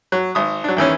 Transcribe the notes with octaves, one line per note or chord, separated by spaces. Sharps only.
F#3
G#1 D#6
F#3 D4
E2 D#3 E3 C#4